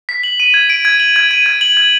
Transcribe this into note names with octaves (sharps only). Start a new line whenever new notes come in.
B6
F#7
D#7
G#6
D7
G#6
F#7
G#6
D#7
G#6
F#7
G#6